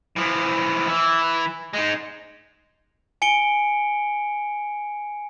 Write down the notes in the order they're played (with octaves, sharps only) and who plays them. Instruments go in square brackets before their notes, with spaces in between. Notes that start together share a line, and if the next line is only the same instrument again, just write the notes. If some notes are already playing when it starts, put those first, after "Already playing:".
[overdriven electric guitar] E3 F3
E3 E4
G#3 D#4
[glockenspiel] G#5 C#7 D7 G7